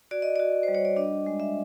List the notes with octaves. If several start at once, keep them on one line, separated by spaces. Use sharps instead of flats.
F#4 D5
D#5
F#4 D5
C5
G3
C#5
D5
D4 D#5
G#3
E5